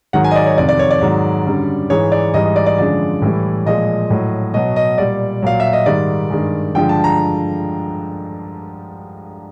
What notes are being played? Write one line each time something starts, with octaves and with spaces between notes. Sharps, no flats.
G#2 D#3 F#3 F#5
G#5
D#5
D5
C#5
F2 C3 D#3 D5
D5
C#5
D5
G#2 D#3 F#3
F#2 D3 G3
G#2 E3 G#3 C#5
D5
G#2 E3 G3 D#5
D#5
D5
D5
F#2 D3 F3 G#3 D5
A2 E3 G3
A#2 F3 G#3 D#5
A2 F#3
B2 F#3 D#5
D#5
A#2 G3 D5
A#2 F#3 F5
E5
D#5
G#2 D#3 G3 D5
G2 D#3 G#3
G2 D3 F3 G#3 G5
A5
A#5